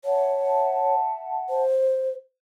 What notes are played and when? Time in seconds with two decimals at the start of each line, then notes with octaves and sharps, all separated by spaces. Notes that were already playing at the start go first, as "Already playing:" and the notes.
0.05 C#5 E5 F#5 A5
1.49 C5